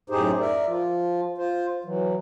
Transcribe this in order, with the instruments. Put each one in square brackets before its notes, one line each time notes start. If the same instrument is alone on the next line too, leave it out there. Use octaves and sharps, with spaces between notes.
[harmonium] F#2 A2 D#4 G4 G#4 C5
A#4 D5 E5
F3 F4
F4 C5
E3 F#3